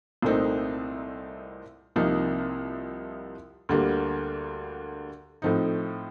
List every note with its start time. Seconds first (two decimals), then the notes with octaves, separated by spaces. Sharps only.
0.22 C2 A#2 A3 C4 D#4
1.96 C2 C3 F3 A#3 D#4
3.69 D2 D3 G3 A#3
5.42 A2 F3 C4 D#4